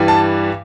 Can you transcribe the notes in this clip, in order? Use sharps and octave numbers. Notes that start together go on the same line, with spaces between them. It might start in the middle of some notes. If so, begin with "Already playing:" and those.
Already playing: G2 E3 G3
A5